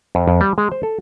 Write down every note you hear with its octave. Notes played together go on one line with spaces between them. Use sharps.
F2
F2
G3
G#3
C5
A4